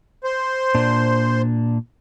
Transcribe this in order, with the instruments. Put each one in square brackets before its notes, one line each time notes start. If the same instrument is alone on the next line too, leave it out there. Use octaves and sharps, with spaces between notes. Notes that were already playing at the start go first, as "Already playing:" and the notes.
[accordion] C5
[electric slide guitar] A#2 D4